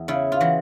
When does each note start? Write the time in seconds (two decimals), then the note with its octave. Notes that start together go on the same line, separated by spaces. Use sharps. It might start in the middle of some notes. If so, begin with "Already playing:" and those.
Already playing: E2
0.08 C#3 E4
0.32 F4
0.41 E3 F#4